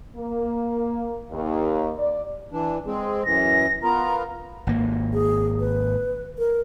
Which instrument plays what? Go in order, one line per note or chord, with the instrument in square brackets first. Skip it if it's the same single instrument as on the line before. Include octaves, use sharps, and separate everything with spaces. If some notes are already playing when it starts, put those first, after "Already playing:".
[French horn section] A#3
D#2
D5
[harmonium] E3 D4
[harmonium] G#3 C4 [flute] G#4
[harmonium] F#2 E3 [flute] A#6
[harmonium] B3 F4 A#4 [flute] A#5
[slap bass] G#1 A#3
[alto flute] G#4
B4
A#4